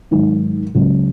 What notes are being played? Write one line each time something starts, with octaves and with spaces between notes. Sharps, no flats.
G#2 D#3 F#3
C#2 C#3 F#3